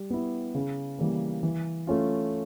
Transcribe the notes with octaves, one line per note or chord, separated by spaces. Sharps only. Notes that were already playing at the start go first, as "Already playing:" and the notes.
Already playing: G3
B3 E4
C#3
E3 G3 A#3
E3
A3 C#4 F4